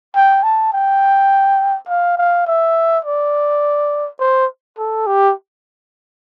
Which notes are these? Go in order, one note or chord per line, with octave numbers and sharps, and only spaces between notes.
G5
A5
G5
F5
F5
E5
D5
C5
A4
G4